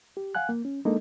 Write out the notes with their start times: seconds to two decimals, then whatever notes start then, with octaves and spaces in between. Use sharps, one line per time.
0.17 G4
0.35 F5 F#5 G#5 F#6
0.49 A#3
0.65 C#4
0.85 G#3 A#3 D4 D#4 A4 D#5